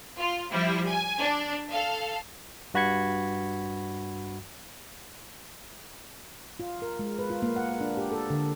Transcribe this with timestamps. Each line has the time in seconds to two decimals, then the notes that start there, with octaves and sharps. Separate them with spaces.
0.18 F4
0.51 F3 G3 E4
0.89 G#5
1.20 D4
1.71 A4 F5
2.74 G2 F#4 B5 G#6 C#7
6.60 F4
6.82 A#4
6.99 G#3
7.19 B4
7.30 F4
7.42 A#3
7.56 F#5
7.80 D4
7.97 G4
8.12 A4
8.30 D3